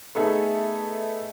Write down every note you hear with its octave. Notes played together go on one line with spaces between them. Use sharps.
A3 B3 D#4 G#4 A4 E5